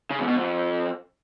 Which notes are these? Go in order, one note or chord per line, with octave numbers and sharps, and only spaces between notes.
C#3
E2
B2
F2